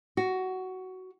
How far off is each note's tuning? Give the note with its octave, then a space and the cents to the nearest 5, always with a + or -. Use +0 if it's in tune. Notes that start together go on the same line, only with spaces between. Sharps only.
F#4 +10